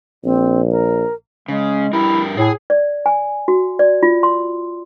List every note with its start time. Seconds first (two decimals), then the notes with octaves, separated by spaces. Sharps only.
0.24 A#1 C4
0.71 A#4
1.48 C#3 G#3
1.93 G2 G3 E4 A#4
2.37 A2 G#4 G#5
2.70 D5
3.06 G#5
3.48 F#4
3.79 D5
4.03 F4
4.23 C6